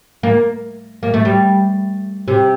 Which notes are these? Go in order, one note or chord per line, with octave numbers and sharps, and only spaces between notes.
A#3
A#3
A3
G3
C3